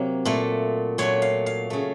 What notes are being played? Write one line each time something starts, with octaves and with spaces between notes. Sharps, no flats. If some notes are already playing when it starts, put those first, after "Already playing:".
Already playing: C3 F#3 A#3
A#2 A3
A#2 F#3 A3 C#5
F5
F5
C#3 A3